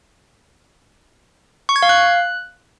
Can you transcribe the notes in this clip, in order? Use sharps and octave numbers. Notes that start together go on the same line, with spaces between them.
C#6
G#6
F5
F#6